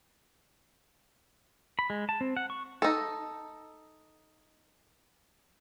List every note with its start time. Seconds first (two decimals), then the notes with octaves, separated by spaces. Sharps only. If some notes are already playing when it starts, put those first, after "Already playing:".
1.79 B5
1.90 G#3
2.09 A5
2.21 C4
2.37 F#5
2.50 C#6
2.82 D#4 A4